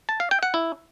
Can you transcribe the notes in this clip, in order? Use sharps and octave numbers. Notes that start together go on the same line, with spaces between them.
A5
F5
G5
F#5
E4